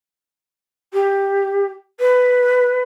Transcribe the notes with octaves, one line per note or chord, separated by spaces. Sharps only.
G4
B4